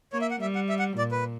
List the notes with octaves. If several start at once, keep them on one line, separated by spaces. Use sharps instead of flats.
A#3 C#5
E5
F#5
G3 E5
F#5
E5
F#5
A#2 D5
B4